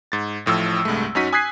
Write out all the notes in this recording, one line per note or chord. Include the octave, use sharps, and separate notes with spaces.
G#2 A6
A1 A2 F3 E6
C2 G2 G#3 A3
F#2 C#4 D#4 F#4 B6 D#7
G#5 D#6 F#6 G#6 B6 C7